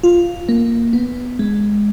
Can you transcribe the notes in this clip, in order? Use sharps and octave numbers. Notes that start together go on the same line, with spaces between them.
F4
A#3
B3
G#3